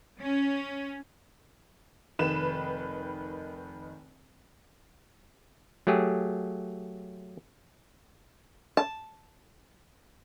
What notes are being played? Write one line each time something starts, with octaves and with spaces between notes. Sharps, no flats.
C#4
F1 D#3 B4 B5 E7
F#3 A3 G4 G#4
A5